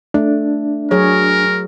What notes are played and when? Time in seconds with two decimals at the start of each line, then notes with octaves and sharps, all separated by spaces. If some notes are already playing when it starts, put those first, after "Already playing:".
0.14 A3 D4
0.91 F#3 G#4 A#4 C#5